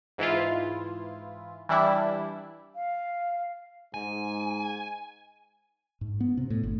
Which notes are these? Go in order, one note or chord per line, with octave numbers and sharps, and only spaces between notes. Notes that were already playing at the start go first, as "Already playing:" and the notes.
G#2 E3 E4 F4
E3 G3 D4 E4
F5
G#2 G#5
G#2
B3
C3
A2
G1